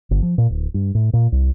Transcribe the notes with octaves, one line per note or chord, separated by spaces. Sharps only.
G1
F3
A#2
D1
G2
A2
A#2
C2